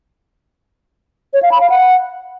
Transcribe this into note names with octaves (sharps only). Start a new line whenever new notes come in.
C#5
F5
B5
F5
F#5